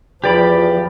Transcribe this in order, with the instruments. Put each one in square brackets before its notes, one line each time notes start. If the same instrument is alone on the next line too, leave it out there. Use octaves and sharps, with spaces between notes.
[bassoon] E2 [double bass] F3 [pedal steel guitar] G4 D5 B5